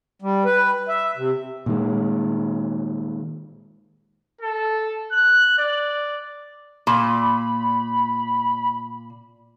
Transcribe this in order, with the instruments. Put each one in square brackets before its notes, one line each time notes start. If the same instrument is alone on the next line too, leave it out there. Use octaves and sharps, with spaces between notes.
[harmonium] G3
B4
E5
C3
[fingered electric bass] A#2 D#3 G#3
[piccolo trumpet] A4
F#6
D5
[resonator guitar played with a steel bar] A#2 [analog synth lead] B5